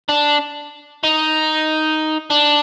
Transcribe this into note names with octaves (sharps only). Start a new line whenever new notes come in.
D4
D#4
D4